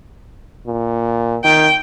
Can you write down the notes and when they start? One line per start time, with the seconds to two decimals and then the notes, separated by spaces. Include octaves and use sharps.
0.66 A#2
1.44 D#3 G5